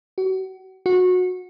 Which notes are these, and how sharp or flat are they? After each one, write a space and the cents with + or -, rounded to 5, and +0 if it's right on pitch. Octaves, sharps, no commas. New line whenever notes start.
F#4 +35
F#4 -20